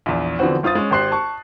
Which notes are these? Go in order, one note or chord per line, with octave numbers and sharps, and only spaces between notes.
A#1 E2
D3 E3 F3 B3 C4 F#4
G1 F4 C5 D#6 A6
G#3 C#4
G#1 G4 C5 C6 F#6 C7
A5 C#6